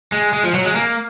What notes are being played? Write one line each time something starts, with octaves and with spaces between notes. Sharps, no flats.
G#3
G#3
F3
F#3
G#3
A#3